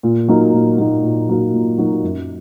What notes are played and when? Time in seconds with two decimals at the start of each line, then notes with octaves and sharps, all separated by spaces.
0.03 A#2
0.28 F#3 A#3 D#4 F#4
0.53 A#2
0.78 F#3 A#3 D#4 F#4
1.04 A#2
1.29 F#3 A#3 D#4 F#4
1.54 A#2
1.78 F#3 A#3 D#4 F#4
2.03 F#2